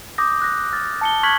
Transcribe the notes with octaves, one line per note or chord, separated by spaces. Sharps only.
D6 D#6 G6 A#6
F#6 A#6
F6 A6
A5 C#7 G7
C#6 F6 F#6 G#6 B6 F#7